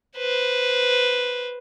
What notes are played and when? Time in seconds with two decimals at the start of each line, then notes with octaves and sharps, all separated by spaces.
0.18 B4 C5